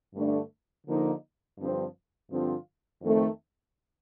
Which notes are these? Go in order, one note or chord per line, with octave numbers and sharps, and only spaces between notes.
G2 D3 A3 D4
D3 F3 A#3 D#4
G2 D3 F3 C4
G2 D3 F3 C4 F4
F2 D#3 A3 C4